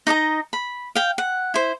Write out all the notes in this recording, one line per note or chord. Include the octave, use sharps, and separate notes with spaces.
D#4 D5 D#5 A#5
B5
F5 G5
F#5
E4 C5